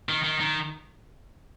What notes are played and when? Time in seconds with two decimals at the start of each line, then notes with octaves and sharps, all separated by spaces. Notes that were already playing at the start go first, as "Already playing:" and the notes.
0.09 D#3
0.24 D#3
0.40 D#3